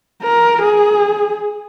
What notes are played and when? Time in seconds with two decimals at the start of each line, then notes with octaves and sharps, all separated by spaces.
0.23 A#4
0.63 G#4